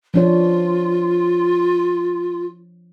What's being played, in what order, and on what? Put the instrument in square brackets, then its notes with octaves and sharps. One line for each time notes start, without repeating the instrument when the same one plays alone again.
[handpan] F3 D4 C#5 [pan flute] F4